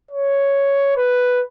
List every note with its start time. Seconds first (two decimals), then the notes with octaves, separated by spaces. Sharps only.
0.11 C#5
0.97 B4